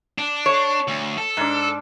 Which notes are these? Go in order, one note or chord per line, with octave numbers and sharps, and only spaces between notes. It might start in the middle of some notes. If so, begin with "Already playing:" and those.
D4
C#5
D2
A4
G#2 D4